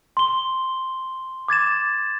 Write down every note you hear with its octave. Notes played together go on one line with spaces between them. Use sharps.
C6 G7
D6 G#6 A6 E7